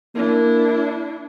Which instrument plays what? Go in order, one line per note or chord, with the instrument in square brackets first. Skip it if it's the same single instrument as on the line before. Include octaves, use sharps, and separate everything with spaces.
[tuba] A#3 [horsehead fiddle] D4 E4